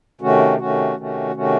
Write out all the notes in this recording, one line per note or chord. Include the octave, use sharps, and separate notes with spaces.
C3 D#3 A3 C#4 F#4
C3 D#3 A3 C#4 F#4
C3 D#3 A3 C#4 F#4
C3 D#3 A3 C#4 F#4